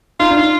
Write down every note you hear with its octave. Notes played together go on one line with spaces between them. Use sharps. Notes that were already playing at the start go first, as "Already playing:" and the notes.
D#4 F4
D4